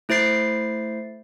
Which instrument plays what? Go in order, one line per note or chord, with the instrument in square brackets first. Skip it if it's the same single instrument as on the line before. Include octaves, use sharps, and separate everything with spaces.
[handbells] A3 E4 C5 A6 C7